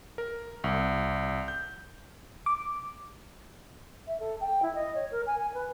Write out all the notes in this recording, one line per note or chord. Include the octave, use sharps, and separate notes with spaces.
A#4
C2
G6
D6
E5
A4
G5
E4
D#5
C#5
A#4
G#5
G#5
B4